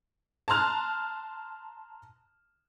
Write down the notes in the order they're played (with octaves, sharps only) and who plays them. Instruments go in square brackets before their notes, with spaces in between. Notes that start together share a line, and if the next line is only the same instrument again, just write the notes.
[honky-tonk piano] A5 A#5 C6 F6 F#6